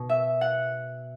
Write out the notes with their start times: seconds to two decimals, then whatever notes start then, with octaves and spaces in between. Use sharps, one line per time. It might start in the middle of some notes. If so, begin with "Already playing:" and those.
Already playing: B2
0.09 E5
0.41 F#5